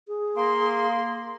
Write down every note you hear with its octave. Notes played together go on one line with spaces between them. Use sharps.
G#4
A#3 C6